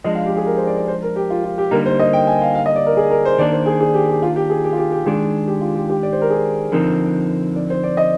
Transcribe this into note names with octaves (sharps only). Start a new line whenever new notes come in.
F3 G#3 D4 D#5
F5
G4
G#4
A#4
C5
D5
D5
C5
A#4
G4
F4
F4
G4
D3 G3 A#3 D#4 A#4
C5
D#5
G5
G#5
F5
F5
D#5
D5
A#4
G#4
A#4
C5
D#3 A#3 D4 D5
C5
G#4
G#4
G4
G4
F4
G4
G#4
G4
F4
G4
G4
D#3 G#3 D4 G#4
G4
F4
G4
G4
D5
C5
A#4
G#4
D3 F3 C4 D#4 A#4
D5
C5
D5
D#5